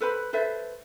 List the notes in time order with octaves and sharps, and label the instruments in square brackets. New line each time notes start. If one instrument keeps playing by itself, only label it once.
[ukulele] A4 B4 C5 B5
A4 B4 C5 E5